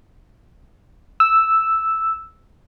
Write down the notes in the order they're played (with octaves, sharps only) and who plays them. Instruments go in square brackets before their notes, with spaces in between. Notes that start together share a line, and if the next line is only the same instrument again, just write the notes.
[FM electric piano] E6